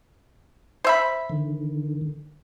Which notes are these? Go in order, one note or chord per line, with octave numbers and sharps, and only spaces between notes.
C5 E5 B5
D3 D#3